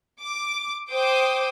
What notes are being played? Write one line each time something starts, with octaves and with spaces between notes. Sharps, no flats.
D6
C5 G5 D6 D#6